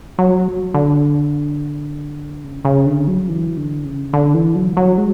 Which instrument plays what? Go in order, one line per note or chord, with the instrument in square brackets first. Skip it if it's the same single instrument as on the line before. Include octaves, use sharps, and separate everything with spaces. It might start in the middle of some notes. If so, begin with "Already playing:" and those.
[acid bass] F#3
D3
C#3
C#3
D3
F#3
E3
D3
C#3
D3
E3
F#3
F#3
G#3